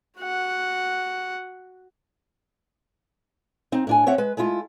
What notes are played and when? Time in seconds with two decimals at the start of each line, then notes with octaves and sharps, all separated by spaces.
0.19 F#4 F#5
3.72 C4 D#4
3.87 A2 D4 G#5
4.06 C4 C#5 E5 F#5
4.18 G#3 B4
4.37 G#3 A3 E4 F4